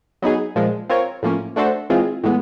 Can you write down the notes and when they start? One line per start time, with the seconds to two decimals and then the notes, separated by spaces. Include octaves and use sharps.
0.22 F#3 B3 D#4 G#4
0.56 A#2 F3 G#3
0.89 C4 F4 A#4 C#5
1.23 A2 F3 A#3 C#4
1.56 A3 D4 F#4 A4 C5
1.90 E3 G#3 C4 F4 G#4
2.23 A2 E3 G#3 B3